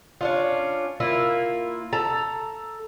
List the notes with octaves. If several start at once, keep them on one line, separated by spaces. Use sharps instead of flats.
C#4 D4 F4
A#3 E4 F4
A4 A#5